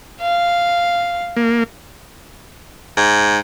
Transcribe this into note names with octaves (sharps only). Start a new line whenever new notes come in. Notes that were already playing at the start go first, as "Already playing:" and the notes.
F5
A#3
G#2